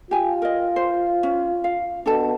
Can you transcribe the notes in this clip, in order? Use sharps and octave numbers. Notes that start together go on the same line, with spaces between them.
F4 G4 G#5
A#4 D#5
C5
C#4
F5
B2 D4 A4 A5